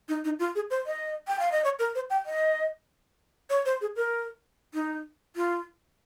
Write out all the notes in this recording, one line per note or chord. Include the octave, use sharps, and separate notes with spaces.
D#4
D#4
F4
G#4
C5
D#5
G5
F5
D#5
C#5
A#4
C5
G5
D#5
C#5
C5
G#4
A#4
D#4
F4